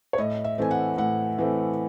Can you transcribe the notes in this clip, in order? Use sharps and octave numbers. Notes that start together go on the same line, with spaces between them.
C#5
A2 D#5
E5
E3 A3 C4 G#5
F#5
A2 F#5
E3 A3 C4